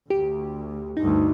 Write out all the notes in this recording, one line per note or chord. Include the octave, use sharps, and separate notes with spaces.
D2 G4
D2 G2 D#4